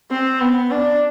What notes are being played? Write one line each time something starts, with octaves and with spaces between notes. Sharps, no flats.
C4
B3
D4